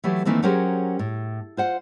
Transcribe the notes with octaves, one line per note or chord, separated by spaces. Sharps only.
E3 F#3 A3 G4
D#3 E3 A3 A#3 C4
F#3 C#4 G4 G#4 A#4 C5
A2
F4 C5 F#5